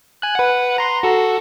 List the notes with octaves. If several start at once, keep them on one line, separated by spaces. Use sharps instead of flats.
G#5 F#6
B4 F#5
A#5 C6
F#4 A4